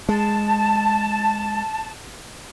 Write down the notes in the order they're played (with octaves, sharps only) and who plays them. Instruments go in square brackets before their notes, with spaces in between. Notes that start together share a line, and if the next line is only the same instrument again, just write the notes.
[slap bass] G#3 [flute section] A5